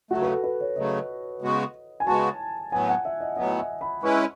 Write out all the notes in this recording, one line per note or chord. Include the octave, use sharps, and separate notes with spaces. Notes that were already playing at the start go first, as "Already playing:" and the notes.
C#3 F#3 A3 F#4
B4
A4
B4
C#5
C#3 F#3 A3 D#5
C#3 G#3 B3 F#4
G#5
C#3 G#3 B3 F#4 A5
A2 F#3 B3 G#5
F#5
E5
D#5
A2 F#3 B3 D#5
E5
B5
G#3 C#4 E4 B4 C#6